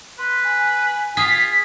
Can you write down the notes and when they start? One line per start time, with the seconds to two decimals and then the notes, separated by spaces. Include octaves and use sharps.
0.19 B4 C6
0.44 G#5
1.17 F4 G#4 B6